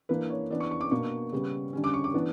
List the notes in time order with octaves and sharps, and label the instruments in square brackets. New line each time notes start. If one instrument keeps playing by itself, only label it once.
[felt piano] E3 A#3 D4 B4
C#5
E3 B3 D4 D5
C#6
C#6
D6
B2 A#3 D4 C#6
C#3 G3 B3
D3 G3 C#4
D6
C#6
D6
E3 B3 D4